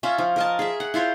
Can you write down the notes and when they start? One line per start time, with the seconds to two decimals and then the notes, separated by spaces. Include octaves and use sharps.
0.03 C#4 F4 E5
0.18 F3
0.36 A#4 D#5 A5
0.59 G#4 E5
0.80 F#5
0.94 E4 F4 C5 C#5